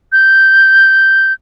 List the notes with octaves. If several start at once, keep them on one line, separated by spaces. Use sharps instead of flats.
G6